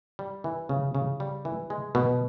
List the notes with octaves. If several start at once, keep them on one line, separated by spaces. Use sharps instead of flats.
G3
E3
C#3
C#3
G3
E3
G#3
B2